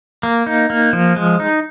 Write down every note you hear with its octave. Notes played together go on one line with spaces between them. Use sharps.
A#3
D#4
A#3
F3
G#3
D#4